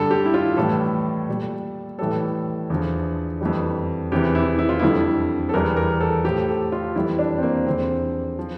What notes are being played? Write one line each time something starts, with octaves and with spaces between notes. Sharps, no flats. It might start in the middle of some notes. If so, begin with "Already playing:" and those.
Already playing: G2 D3 G3 A4
G4
E4
F4
A2 E3 G3 A4
A#2 G3
A2 E3 G3 A4
E2 D3 F3
F2 E3 G3
E2 C3 E3 G4
E4
E4
F4
F2 D3 G3 E4
A4
E2 E3 G3 A#4
A#4
A4
A2 F3 G4
A4
F4
F2 E3 G3 E4
D4
C4
A#3
E2 D3 F3 C4
F3